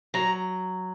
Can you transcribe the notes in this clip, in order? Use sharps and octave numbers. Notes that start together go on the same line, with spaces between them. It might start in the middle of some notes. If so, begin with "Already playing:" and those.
F#3 A#5